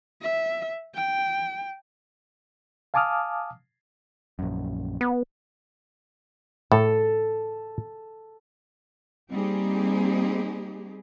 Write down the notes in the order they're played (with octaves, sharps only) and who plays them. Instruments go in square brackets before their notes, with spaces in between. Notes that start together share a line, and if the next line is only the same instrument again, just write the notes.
[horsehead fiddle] E5
G5
[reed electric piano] F5 G#5 A5 D6 D#6 F6
[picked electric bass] A#1 F#2
[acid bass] B3
[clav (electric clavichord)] A2 [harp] A4
[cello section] G3 A#3 C4 D#4 G4 G#4